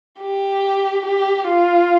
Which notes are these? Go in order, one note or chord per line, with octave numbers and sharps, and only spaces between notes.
G4
G4
F4